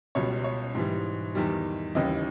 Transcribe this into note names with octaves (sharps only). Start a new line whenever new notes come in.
C#2 B2 G3 C#5
C#5
G#2 E3 G3
E2 D#3 G3
D#2 C#3 E3 G3 D#5